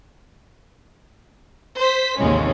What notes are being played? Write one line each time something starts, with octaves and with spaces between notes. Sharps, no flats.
C5 B6
A1 D#2 C3 G#3 C#4